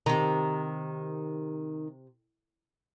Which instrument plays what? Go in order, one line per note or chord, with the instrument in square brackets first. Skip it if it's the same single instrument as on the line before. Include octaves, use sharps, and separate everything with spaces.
[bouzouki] C3 A#5 [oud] D#3